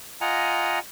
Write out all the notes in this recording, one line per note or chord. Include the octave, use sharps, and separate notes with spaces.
F4 D#5 F#5 G#5 A#5